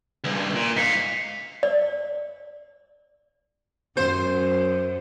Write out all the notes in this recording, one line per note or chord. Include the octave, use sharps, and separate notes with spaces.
C#2 G2
A#2
G#2 F5 B6 C#7
D5
F#2 C5